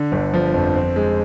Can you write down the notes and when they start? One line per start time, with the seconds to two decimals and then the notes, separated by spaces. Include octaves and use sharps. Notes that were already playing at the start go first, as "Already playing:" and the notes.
Already playing: D3
0.12 G1
0.34 F3
0.54 F2
0.76 C4
0.96 G#3